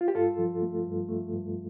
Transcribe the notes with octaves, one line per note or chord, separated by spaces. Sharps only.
F4
G4
G2 F4 A4
F3
A3
G2
A3
G2